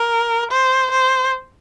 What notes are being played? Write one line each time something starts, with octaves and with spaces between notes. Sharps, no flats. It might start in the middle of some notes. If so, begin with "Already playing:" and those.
Already playing: A#4
C5
C5